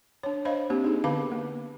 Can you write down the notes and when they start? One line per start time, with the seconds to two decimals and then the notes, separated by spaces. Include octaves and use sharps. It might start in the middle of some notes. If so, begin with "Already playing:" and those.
0.23 D4 C#5
0.45 C5 D#5 F5 B5
0.70 A#3 C4 D4 G4
0.84 D#4 G#4
1.04 D3 B3 B4 F5 B5 D6
1.32 A#3